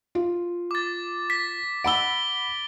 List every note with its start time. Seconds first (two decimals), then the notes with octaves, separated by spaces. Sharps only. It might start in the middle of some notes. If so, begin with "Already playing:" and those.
0.15 F4
0.71 D6 A6
1.30 B6
1.84 F#5 B5 E6 D7 G7